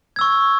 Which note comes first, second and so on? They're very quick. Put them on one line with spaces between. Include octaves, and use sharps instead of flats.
G#6 E6 C#6